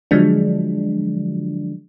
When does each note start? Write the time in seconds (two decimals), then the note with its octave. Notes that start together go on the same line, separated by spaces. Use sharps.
0.11 D3 F3 F#3 G#3 D4